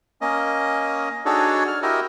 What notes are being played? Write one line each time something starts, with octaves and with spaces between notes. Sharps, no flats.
A#3 C#4 D#5
D4 D#4 F#4 G#4 A4 C#5
F6
E4 F#4 G4 A#4 D#5 E5